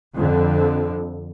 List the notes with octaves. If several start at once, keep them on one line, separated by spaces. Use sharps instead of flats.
F2 D3